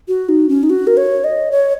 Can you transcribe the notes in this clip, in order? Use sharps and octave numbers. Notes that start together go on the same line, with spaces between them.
F#4
D#4
C#4
D#4
F#4
A#4
C#5
D#5
C#5